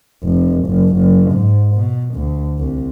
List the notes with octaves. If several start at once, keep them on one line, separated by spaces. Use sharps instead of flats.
F1
F#1
F#1
G#2
B2
D2
C2